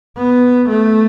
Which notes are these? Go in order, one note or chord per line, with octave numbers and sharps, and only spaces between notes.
B3
A3